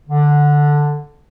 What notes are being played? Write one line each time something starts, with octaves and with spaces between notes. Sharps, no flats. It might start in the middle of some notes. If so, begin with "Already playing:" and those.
D3